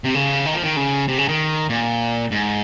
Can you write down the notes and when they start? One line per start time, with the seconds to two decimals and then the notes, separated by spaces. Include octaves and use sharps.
0.04 C3
0.15 C#3
0.46 D#3
0.54 F3
0.63 D#3
0.77 C#3
1.08 C3
1.18 C#3
1.28 D#3
1.69 A#2
2.31 G#2